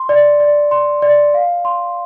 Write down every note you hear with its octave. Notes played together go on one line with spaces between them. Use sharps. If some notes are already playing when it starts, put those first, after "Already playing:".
Already playing: C6
D5
D5
C6
D5
F5
C6